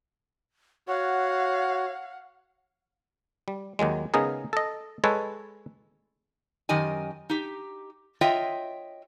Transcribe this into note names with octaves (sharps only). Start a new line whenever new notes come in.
F#4 C#5 F5 F#5
G3
D#2 D#3 F#3 G#3
C#3 G#3 B3 D#4 G#4 A#4
A4 D#5
G#3 A4 B4 C#5
F#2 D#3 G4 D#5 G#5
D#4 G4
F4 C#5 D#5 E5 G5